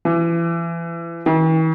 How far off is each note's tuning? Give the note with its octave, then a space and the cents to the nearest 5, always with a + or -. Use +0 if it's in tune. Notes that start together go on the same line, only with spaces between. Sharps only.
E3 +30
E3 -45